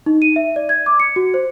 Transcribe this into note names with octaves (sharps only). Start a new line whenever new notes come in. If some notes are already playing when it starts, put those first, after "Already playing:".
D#4
D#7
E5
D5
G#6
D6
C#7
F#4
C5